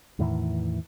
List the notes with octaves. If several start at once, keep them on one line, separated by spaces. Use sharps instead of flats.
E2 A2 D#3 E3